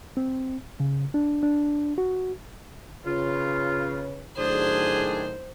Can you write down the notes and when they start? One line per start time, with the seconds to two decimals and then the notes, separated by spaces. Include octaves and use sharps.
0.17 C4
0.80 C#3
1.14 D4
1.43 D4
1.98 F#4
3.06 C#3 F4 B4 C#5
4.38 A2 D#3 F#3 D4 G#4 C5